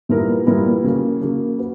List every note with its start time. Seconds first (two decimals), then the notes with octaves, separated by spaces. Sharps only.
0.09 A#2 G3 B3 E4 A#4
0.47 A#2 G3 B3 E4 A#4
0.84 C#3 F#3 A#3
1.21 C#3 F#3 A#3
1.59 F#4 B4